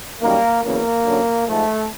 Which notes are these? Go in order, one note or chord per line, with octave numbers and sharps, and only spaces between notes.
F#2 D#3 G3 A#3
E2 C#3 F#3 A#3
F#2 D3 F#3
G#2 F3 A3